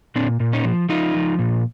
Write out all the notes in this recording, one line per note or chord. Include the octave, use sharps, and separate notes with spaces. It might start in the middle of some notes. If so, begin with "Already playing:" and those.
A#2 C4 D4
A#2
C#4 D#4
F3
F3 D#4 F4
F3
A#2